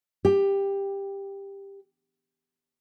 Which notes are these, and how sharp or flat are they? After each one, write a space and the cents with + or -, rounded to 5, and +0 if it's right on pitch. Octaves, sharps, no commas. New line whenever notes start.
G4 +10